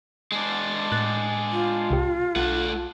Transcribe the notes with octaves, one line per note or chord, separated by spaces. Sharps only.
G#3 D4
A2 F#6 A6
F4
C2 G4
B1 A3 F#5